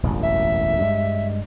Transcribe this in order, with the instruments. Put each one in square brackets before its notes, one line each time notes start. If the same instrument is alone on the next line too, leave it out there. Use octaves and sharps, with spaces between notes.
[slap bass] E1 A1 F#2
[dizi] E5
[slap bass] G2 G#3